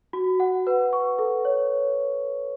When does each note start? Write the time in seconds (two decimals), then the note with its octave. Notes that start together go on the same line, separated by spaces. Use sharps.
0.13 F#4
0.40 F#5
0.67 B4
0.93 C#6
1.19 A4
1.45 C#5